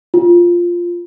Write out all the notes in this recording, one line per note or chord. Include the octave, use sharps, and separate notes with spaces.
F4